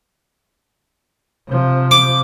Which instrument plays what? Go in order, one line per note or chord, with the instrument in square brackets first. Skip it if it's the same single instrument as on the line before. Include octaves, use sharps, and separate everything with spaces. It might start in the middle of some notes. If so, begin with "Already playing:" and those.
[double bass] C3 F3
[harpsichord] D6